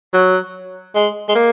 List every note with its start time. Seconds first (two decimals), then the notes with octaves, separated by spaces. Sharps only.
0.14 F#3
0.95 G#3
1.29 G#3
1.35 A#3